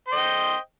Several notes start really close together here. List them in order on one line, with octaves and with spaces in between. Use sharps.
C5 D#5 G5